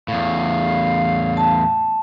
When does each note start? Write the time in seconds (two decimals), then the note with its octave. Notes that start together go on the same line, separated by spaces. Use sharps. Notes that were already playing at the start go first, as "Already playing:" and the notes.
0.08 E2 A2 F5
1.37 A5